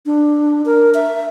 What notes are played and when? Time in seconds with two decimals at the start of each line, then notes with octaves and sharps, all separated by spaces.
0.06 D4
0.66 A#4
0.94 E5